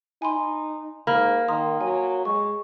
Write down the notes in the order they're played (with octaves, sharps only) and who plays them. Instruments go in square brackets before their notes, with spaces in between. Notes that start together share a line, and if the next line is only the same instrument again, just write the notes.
[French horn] D#4 [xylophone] G#5 B5 C6
[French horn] G#2 [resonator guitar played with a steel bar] A#3 [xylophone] B5 F6
[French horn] D#3 [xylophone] A#5 C6 D#6
[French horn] F#3 [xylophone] G#5
[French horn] G#3 [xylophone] C#6